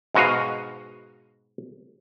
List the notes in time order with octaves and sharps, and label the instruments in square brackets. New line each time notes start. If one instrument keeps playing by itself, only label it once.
[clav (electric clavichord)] G#2 B2 F#4 D#5 F5